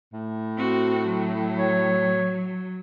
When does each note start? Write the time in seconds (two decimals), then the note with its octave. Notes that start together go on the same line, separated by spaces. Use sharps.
0.13 A2
0.57 C4 F#4
1.06 F#3
1.58 C#5